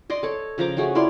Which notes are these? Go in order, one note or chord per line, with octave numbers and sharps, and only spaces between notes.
D5 D#5 C6
A4 C#5
C#3 F3 A#5 D6
A3 C#4 F#4 G#4
E4 F4 D5 C6